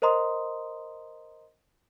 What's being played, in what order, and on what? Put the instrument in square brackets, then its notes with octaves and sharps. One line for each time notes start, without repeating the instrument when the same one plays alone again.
[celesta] A#4 C5 D#5 A#5 C6 D#6